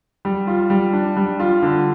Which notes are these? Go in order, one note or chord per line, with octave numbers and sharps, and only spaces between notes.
G3
F4
G3
D4
G3
F4
D3